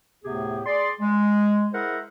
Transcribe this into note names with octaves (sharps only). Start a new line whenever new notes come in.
D2 A2 C3 B3 G4 G#4
G#4 D5 C6
G#3
E4 G#4 A#4 C5 E5 F#5